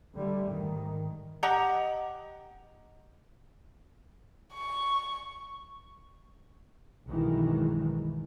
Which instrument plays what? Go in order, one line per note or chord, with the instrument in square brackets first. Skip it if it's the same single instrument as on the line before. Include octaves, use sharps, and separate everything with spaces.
[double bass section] D3 G3 A3
G#2 D#3
[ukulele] G4 D#5 F#5 A#5
[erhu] C#6
[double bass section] B1 G2 D#3 E3 F#3 G#3